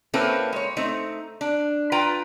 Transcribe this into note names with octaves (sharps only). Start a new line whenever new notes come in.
A#3 C4 C#4 E4 A4 B4
G#3 C#5
A3 C4 D#4
D4
F4 B4 G5 A#5